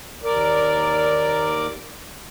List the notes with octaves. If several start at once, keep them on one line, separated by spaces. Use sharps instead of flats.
D#2 A#4 D5